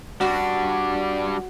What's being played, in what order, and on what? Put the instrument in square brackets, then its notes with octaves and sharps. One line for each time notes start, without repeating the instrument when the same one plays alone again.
[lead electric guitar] G3 D4 [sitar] F#4